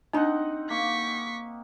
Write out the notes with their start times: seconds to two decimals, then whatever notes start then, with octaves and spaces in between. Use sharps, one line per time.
0.13 C4 D4 D#4 D#5 F#5 A#5
0.70 A#3 C#6 B6